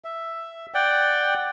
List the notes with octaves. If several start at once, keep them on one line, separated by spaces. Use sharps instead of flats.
E5
D5 F#5 G5